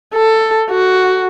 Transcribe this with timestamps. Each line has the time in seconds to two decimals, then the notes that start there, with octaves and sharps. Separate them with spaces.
0.14 A4
0.70 F#4